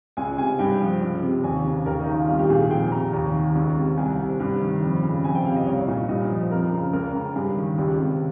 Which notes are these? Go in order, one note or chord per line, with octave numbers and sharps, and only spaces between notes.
C#2 G#5
C3 G#5
G2 G5
F3
C#2
C3
D#2 G#5
C#3
D#2 A#4
D#4
D#3
F4
C2 F4
G4
A#2 G#4
G#4
F2 G5
C3 A#5
D#2
D#3
C#2
C3
C2 G#5
C3
G2
D#3
F2
C#3
F2 G#5
G5
C3 F5
D#5
C2 C#5
A#2
G2 D#5
F3
F2 A#4
C#3
C#2 A#4
C#3
G2 G#4
D#3
C#2 G4
C3